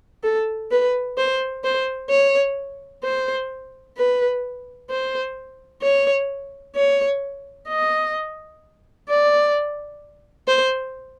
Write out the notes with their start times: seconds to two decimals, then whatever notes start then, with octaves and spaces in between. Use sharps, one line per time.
0.24 A4
0.71 B4
1.18 C5
1.64 C5
2.10 C#5
3.03 C5
3.97 B4
4.90 C5
5.82 C#5
6.76 C#5
7.68 D#5
9.09 D5
10.48 C5